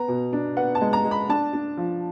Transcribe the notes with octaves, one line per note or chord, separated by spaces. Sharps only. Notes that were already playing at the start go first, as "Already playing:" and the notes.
Already playing: B3 A#5
B2
D4
B3 F#5
A5
G#3
A#5
G#3
B5
D4 A5
D4
F3